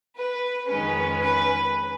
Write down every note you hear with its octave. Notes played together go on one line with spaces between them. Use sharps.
B4
F2 D#3 G#3 C#4 B4
B4